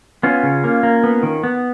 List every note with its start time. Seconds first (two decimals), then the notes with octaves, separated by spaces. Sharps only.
0.23 B3 C#4 F4
0.43 C#3
0.64 A#3
0.83 A#3
1.03 B3
1.23 D#3
1.43 B3